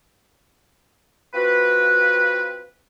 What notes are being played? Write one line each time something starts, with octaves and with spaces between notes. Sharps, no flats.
C4 F4 F#4 B4